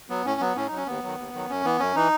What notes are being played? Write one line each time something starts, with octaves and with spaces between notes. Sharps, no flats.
F#3 B3
A2 C#4
F#3 B3
A2 C#4
F#3 D#4
C#4
D#2 B3
D#3 F#3
D#2
D#3 F#3
F#2 C#4
E3 B3
F#2 C#4
E3 D#4